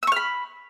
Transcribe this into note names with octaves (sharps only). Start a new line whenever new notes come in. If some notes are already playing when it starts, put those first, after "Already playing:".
B5 C#6 E6 F6